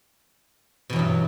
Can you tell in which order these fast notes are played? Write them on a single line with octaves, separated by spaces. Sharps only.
B2 E2 F#3 G2